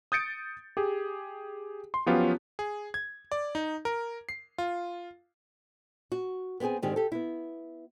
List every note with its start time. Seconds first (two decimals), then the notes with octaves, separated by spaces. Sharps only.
0.12 D#6 G6 A6 C#7 D7
0.77 G4 G#4
1.94 C6
2.06 F3 F#3 B3 C#4 F4 G4
2.59 G#4
2.94 G#6
3.32 D5
3.55 D#4
3.85 A#4
4.29 C7
4.58 F4
6.12 F#4
6.60 B3 C4 G4 G#4 G#5
6.82 G#2 D3 D#3 C4 G4 G#4
6.96 G4 A4
7.12 B3 E4